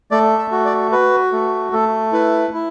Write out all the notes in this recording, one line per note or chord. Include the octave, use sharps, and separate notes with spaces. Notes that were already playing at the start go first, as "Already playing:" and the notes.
A3 D5
E5
F#4
D5
F#4 B4
A3
A3 A4
E4 B4
E4